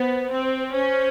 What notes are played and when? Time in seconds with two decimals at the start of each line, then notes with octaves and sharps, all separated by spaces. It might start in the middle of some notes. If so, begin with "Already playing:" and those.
Already playing: B3 C5
0.30 C4
0.72 C#4 C5